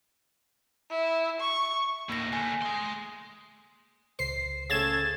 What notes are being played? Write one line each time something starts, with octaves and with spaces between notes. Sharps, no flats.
E4
C#6
D#2 A2 A#3 A#6
D3 A3 G#5
G#4 C6
C#2 C5 C7
C#3 A3 G#6 A6 E7